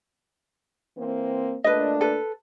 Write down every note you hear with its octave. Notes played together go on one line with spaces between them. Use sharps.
E3 A#3 C4
A#2 A3 D4 B4 D#5
A4 B4